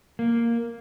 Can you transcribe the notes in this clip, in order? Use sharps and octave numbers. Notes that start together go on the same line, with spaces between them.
A#3